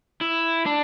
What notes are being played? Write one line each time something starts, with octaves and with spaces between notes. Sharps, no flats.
E4
D4